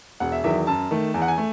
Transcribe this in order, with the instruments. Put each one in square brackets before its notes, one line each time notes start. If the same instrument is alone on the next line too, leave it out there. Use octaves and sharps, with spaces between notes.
[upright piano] E1 F#5
E5
E2 D#3 F#3 E5
F#2 A5
D#3 A3
E2 G#5
F#5
G#5
A3